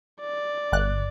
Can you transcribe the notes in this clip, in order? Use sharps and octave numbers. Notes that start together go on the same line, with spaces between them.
D5
G1 F#6